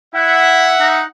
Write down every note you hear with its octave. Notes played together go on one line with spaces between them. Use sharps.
E4 E5 F#5
D#4